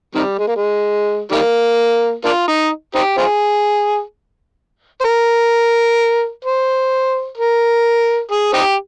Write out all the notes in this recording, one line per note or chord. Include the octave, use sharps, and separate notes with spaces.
C3 D#3 G3
G#3
A#3
G#3
D#3 G3 A#3
A#3 D4 F4
D#4
C4 D#4 G4
C4 F4 G#4
C5
A#4
C5
A#4
G#4
C4 D#4 G4